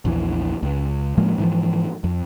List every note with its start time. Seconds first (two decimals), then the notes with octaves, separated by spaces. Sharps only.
0.05 A#1 E2 E3
0.63 C#2
1.18 A2 F3 G#3 A#3
1.38 G#2 E3 F3
2.04 F2